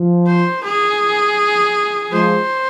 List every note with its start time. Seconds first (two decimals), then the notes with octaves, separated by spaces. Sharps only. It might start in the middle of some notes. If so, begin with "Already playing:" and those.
Already playing: F3
0.27 C5
0.64 G#4
2.11 F3 G#3 C5